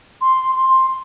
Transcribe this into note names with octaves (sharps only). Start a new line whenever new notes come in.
C6
C6